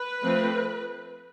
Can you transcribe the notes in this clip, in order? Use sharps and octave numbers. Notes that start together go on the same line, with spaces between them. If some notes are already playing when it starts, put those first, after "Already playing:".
Already playing: B4
F3 A3 C4